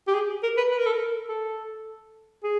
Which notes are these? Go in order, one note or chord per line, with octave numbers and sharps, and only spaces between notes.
G4
G#4
A#4
B4
B4
A#4
A4
A#4
A4
G#4